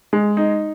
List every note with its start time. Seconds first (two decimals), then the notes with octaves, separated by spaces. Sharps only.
0.13 G#3
0.37 D#4